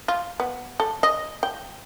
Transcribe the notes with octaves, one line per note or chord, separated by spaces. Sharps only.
F4
B3
A4
D#5
G5